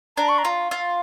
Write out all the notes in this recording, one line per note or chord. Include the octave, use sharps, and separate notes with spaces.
D4 A#5
C#6
A#5
F4
F4